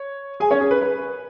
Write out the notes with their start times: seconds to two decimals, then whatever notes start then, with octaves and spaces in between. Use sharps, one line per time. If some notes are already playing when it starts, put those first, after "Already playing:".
Already playing: C#5
0.40 G#4 G#5
0.51 C#4 C#5
0.61 G#4
0.71 B4
0.81 B4